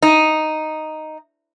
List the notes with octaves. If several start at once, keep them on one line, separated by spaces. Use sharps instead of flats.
D#4